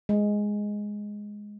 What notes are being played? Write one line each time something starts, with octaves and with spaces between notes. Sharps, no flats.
G#3